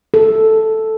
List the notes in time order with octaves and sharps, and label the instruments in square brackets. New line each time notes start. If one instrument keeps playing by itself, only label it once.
[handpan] A4